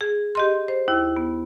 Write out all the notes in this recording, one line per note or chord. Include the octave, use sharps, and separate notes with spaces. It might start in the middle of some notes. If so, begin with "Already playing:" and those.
G#4
G4 D#5 C6
C5
D#2 E4
B3